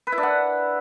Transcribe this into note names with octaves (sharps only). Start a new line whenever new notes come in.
B4
E4
D4
F#5